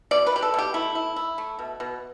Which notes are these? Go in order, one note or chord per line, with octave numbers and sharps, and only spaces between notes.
B2 D5
B4
B2 G4
A4
B2 G4
A3 E4
E4
E4
A3
B2
B2